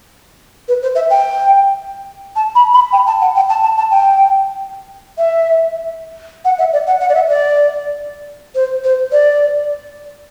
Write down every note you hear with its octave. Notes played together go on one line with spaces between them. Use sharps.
B4
C5
E5
G5
A5
B5
B5
G5
A5
F#5
G5
A5
A5
A5
G5
E5
F#5
E5
D5
F#5
F#5
D5
E5
D5
C5
C5
D5